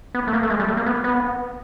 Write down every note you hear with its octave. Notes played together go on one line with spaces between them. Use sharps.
B3
A3
A#3
A3
G#3
G3
A3
A#3
B3
B3